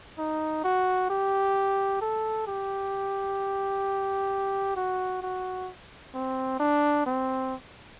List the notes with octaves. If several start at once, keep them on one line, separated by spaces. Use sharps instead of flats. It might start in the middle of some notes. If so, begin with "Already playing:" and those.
D#4
F#4
G4
A4
G4
F#4
F#4
C4
D4
C4